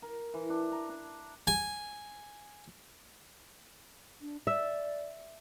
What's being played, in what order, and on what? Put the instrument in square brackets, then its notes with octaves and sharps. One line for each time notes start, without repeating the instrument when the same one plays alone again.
[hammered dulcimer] A#4
E3
D4
A#5
D4
[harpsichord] G#5
[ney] D4
[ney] D5 [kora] E5